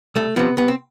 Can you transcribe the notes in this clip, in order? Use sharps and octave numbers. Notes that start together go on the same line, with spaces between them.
C2 A3
C3 F3 B3
C2 B3
C4